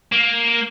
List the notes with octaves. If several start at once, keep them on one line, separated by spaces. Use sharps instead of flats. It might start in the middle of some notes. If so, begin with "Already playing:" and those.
A#3